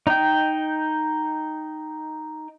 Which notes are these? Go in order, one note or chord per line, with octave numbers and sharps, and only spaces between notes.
D#4 G5